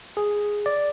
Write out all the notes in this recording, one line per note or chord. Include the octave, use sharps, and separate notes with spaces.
G#4
D5